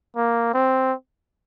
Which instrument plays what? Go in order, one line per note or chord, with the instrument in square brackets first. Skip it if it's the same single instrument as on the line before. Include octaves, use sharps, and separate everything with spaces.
[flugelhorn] A#3
C4